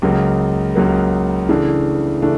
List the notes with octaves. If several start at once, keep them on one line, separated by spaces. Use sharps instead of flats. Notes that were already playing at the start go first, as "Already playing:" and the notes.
C#2 C#3 F#3 A#3
C#2 C#3 F#3 A#3
C#3 E3 A3 D4
C#3 E3 A3 D4